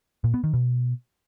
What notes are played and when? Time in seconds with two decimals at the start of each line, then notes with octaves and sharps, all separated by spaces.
0.24 A#2
0.34 B3
0.44 D#3
0.53 B2